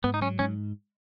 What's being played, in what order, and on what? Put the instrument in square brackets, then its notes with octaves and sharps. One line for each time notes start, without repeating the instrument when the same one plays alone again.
[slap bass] G#2 [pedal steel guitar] B3
[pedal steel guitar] D#4
[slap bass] F#3 [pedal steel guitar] C#4
[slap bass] G#2 [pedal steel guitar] C#4